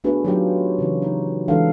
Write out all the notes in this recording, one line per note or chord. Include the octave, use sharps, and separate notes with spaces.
A3 B3 D4 F#4 G#4 B4
F#3 D#4 F4 G4 G#4
C#3 E3 F#4
D#4
E3 G#3 D4 A4 F5 F#5